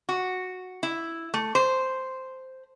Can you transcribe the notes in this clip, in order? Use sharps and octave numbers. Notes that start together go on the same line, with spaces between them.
F#4
E4
A3
C5